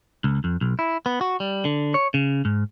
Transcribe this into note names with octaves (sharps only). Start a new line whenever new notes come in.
C#2
F2
B1
E4
B3
F#4
G3
D3
C#5
C#3
G#2